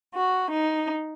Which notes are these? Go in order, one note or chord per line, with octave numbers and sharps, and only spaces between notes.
F#4
D#4